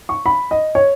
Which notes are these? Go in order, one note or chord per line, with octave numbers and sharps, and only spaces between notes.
C#6
B5
D#5
C#5